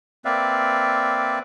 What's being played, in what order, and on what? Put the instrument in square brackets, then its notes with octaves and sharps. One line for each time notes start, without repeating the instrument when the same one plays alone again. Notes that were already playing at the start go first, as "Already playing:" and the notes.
[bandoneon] A#3 C4 B4 D5 E5 F5